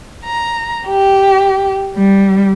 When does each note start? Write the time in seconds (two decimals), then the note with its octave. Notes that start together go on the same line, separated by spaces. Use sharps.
0.24 A#5
0.86 G4
1.96 G3